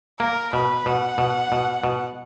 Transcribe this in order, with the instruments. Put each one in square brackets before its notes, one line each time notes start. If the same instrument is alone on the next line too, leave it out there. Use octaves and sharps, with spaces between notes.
[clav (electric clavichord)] A#3 [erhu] A#4
[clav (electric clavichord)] B2 [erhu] B4
[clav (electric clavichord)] B2 [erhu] F#5
[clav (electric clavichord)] B2
B2
B2